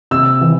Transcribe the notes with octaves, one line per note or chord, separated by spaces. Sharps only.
C3 E6
E3